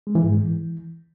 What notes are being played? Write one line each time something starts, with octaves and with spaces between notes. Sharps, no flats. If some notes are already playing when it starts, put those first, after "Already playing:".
G#3
E3
G#2
G#3
E3